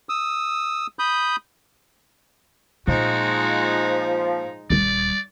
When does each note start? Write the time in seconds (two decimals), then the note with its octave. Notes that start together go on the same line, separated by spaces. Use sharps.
0.09 D#6 E6
0.99 B5 D#6 G6
2.88 A#2 F3 G#3 D#4 F#4
4.70 D#1 G3 D5